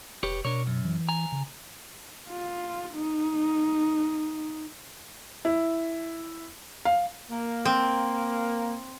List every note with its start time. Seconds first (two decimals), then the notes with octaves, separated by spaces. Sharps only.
0.23 E1 G4 B4 C#5
0.45 B2 D4 A#4 C#5
0.67 F#2
0.85 E3
1.09 G#5 A#5
1.32 C#3
2.30 F4
2.94 D#4
5.45 E4
6.85 F5
7.31 A#3
7.65 C4